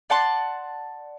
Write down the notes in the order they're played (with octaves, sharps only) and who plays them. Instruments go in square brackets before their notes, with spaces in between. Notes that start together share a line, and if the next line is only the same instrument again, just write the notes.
[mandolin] D5 F#5 A5 C6